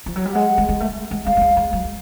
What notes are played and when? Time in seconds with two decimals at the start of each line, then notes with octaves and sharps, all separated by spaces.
0.06 F3
0.16 F#3
0.25 G3
0.34 G#3 F#5
0.58 G#3
0.69 G#3
0.80 A3
1.11 G#3
1.26 G#3 F5
1.37 G3
1.41 G#3
1.57 G#3
1.73 F#3